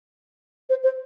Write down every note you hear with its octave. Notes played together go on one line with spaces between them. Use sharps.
C5
C5